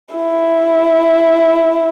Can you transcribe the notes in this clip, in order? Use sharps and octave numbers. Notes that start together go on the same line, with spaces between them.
E4